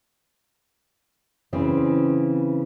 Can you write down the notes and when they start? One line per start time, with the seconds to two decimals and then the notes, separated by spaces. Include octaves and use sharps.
1.53 C#3 E3 C4